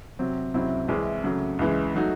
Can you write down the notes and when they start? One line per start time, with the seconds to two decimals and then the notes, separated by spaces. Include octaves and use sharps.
0.19 C3 F#3 C4
0.54 C#2 C3 F#3 C4 E4
0.88 C2 C3 E3 G#3
1.24 C#3 F#3 A3
1.59 C#2 C#3 E3 G#3
1.95 F#3 A3 D#4 F#4